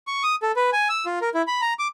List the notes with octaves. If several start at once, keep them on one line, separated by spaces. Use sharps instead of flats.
C#6
D#6
A4
B4
G#5
E6
F4
A#4
E4
B5
A#5
D6